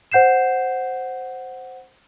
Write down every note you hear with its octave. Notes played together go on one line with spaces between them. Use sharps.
C5 F#5 G6 C7 E7